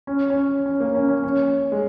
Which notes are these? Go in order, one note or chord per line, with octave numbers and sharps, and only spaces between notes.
C#4
C#4
C#4
A#3
C#4
C#4
C#4
G#3